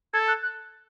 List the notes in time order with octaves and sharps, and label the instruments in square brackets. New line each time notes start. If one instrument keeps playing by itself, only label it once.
[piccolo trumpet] A4 [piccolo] G#6
[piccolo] F#6
F#6